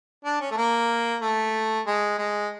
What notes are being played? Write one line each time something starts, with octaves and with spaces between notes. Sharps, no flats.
D4
C#4
A3
A#3
A3
G#3
G#3